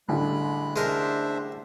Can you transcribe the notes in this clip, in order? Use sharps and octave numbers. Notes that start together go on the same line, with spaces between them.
A1 D3 G3 G#3 B5 F#6
G#3 D4 A#4 C5 E5